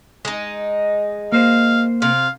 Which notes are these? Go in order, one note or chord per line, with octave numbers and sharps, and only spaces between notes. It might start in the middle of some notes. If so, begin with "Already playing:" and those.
G#3 D#4
A#3 C5 F5
C3 F5